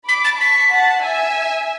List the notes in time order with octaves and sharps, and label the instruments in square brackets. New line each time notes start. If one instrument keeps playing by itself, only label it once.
[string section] B5 D6 [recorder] B6
[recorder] A6
[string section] A5 C#6 [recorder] B6
[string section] F#5 A5
E5 G#5